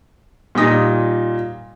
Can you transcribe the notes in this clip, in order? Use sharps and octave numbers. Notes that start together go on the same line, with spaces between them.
A#2 G3 D#4 F4 D#6 A#6